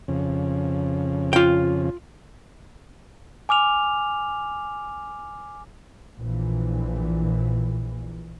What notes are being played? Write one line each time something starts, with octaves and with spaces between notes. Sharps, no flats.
F2 C#3
F4 G5
G#5 D6 F6 F7
A#1 A#2 E3